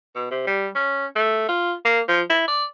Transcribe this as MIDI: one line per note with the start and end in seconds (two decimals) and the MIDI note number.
0.15 0.28 47
0.31 0.42 48
0.47 0.68 55
0.75 1.06 61
1.16 1.47 57
1.49 1.73 65
1.85 2.01 58
2.09 2.21 53
2.30 2.46 64
2.48 2.65 74